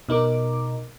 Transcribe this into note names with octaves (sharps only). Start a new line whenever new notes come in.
B2 D#4 A#4 D6